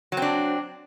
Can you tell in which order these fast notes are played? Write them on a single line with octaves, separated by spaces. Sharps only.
F#3 C4 D4